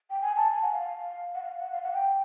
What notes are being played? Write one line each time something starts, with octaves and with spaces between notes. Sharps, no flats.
G5
G#5
A5
G#5
F#5
F5
F#5
F5
F#5
F5
F#5
G5